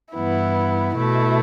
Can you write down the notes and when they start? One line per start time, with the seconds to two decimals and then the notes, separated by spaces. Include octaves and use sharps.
0.14 G2 E3 B3 E4
0.96 B2 A3 E4